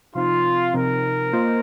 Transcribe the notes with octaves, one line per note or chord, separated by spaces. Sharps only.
C3 F3 C4 D#4 F4
C3 F3 C4 D#4 A#4
A#3 F4 C5 D#5